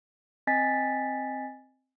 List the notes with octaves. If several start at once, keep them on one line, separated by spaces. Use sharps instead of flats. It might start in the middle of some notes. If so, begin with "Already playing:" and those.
C4 D#5 G#5 A6 B6